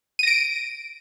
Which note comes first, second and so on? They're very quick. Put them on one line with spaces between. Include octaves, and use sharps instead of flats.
D#7 A#6 D7